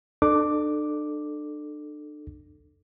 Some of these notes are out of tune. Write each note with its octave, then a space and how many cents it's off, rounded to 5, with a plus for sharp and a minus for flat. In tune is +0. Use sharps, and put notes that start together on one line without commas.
D4 +35 A4 +0 D6 +0